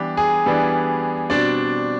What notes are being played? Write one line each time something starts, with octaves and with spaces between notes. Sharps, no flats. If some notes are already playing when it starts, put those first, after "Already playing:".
Already playing: E3 G3 B3 D4 G4
G#4
E3 G3 B3 D4
B2 G3 C4 D4 D5